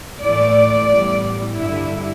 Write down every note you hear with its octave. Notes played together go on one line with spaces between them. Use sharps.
A2 E3 A3 D5
A2 E3 G3 B3
G2 D3 G3 E4